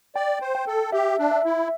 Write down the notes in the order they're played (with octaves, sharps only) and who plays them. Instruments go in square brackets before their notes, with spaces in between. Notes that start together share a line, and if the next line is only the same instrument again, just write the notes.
[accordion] D5 [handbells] G5
[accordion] C5
[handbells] G5
[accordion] A4
[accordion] G4 [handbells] E5
[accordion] D4
[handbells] E5
[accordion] E4